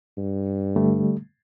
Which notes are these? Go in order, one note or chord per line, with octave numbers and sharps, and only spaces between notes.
G2
D3 G3 A3